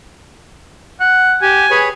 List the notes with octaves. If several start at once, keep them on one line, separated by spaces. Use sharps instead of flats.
F#5
G4 G#5
G#4 B4 C#5